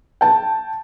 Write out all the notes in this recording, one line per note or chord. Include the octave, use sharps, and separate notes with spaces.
G5 A5